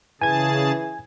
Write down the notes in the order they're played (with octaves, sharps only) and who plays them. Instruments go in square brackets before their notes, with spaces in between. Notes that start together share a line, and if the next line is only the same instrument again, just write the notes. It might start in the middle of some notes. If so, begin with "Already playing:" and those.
[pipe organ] C#3 G#4 A5 [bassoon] E3 [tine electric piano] G#5 G#6